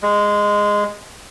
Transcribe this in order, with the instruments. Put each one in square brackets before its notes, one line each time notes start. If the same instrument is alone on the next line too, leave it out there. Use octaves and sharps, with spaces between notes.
[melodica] G#3